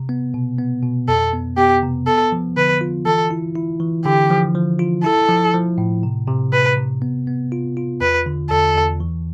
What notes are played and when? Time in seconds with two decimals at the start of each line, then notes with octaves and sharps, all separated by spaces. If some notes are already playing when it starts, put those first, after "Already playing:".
Already playing: C3
0.09 B3
0.34 B2
0.58 B3
0.83 B2
1.08 F2 A4
1.33 B3
1.57 B3 G4
1.83 C3
2.07 B3 A4
2.32 F3
2.57 D3 B4
2.81 F4
3.06 E3 A4
3.31 E4
3.56 E4
3.80 E3
4.05 D3 G4
4.30 F3
4.55 F3
4.79 F4
5.04 E4 A4
5.29 F3
5.54 F3
5.78 A2
6.03 C3
6.28 C3
6.53 C3 B4
6.77 C3
7.02 B3
7.27 B3
7.52 F4
7.77 F4
8.01 E2 B4
8.26 D3
8.51 E2 A4
8.75 E2
9.00 E3